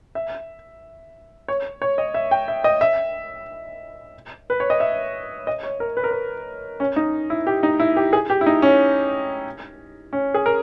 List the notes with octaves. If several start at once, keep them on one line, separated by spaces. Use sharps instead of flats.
E5
C#5
C#5
D#5
E5
G5
E5
D#5
E5
B4
C#5
D#5
E5
D#5
C#5
A#4
B4
A#4
B4
C#4
D#4
E4
G4
D#4
E4
G4
G#4
G4
E4
D#4
C#4
C#4
G#4
A#4